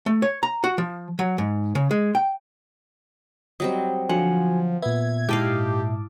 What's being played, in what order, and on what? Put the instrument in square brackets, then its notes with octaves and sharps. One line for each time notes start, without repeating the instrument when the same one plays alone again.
[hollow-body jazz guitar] A3
C#5
A#5
F#4
F3
F#3
G#2
C#3
G#3
G5
[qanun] F#3 G3 C4 [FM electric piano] D#5
[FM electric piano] D3 F#3 [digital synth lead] F3 [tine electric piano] F#4 G#5 [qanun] F#5
[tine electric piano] A#2 E5 [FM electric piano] B3 [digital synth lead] G#6
[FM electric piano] G#2 A5 D6 [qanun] E4 D#5 F5 [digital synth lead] G4